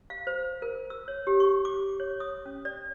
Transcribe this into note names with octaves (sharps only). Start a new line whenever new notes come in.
F5
C5
A#4
E6
C#5
G4
C#6
D6
C#5
D#6
C#4
D5